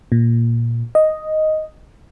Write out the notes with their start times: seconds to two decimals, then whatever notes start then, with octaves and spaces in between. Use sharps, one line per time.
0.12 A#2
0.95 D#5